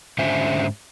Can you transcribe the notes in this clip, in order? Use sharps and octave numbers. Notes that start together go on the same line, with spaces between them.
G#2 D3 C#4 C5 E5 G#5